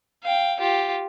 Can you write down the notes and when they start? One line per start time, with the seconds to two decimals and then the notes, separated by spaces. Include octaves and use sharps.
0.23 F5 G5
0.60 F4 G4